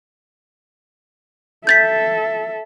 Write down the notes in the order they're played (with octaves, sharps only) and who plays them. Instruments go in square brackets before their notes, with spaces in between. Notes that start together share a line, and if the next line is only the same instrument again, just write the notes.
[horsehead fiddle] A4 E5 [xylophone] G6 A6 B6